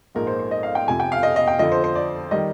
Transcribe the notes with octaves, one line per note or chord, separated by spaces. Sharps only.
A#1 G#2 F3 G#3 D#4 A#4
C5
C5
D#5
F5
G5
F2 C3 F3 G#5
G5
F5
D#5
D#5
G5
F2 D3 F3 D#5
C5
C5
D5
D#3 G3 D#5